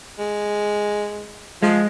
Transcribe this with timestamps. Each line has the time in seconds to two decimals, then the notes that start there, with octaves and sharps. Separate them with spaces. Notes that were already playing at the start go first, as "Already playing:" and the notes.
0.19 G#3
1.63 F3 G#3